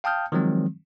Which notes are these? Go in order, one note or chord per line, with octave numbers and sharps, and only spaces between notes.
F5 G5 A5 D#6 F6 G6
D#3 F3 F#3 G#3 C4